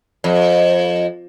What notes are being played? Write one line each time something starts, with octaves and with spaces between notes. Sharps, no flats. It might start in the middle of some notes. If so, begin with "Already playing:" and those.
F2